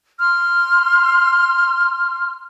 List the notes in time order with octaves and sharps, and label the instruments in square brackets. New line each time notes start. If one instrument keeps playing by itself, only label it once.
[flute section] C6 F6